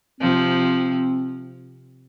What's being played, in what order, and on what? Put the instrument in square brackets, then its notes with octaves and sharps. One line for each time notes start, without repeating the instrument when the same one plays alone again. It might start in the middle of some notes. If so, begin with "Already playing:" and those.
[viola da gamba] C3 F3 [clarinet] C4